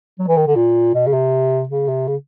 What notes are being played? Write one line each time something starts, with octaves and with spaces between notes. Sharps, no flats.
F#3
E3
D#3
D3
A#2
B2
C#3
C3
C#3
C3
C#3